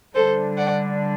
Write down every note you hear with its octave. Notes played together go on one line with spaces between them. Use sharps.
D3 G3 D4 A4 C5
D5 F#5